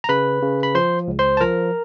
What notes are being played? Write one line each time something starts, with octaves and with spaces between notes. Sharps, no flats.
A#5
C#3 B4 B5
C#3
B5
F3 C5 C6
C#2
C5 C6
A5
F3 A#4 A#5